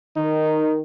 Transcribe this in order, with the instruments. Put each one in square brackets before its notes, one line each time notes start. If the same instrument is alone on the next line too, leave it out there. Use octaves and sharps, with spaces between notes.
[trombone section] D#3 [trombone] D#4